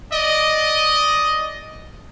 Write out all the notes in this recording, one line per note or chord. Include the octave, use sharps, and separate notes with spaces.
D5 D#5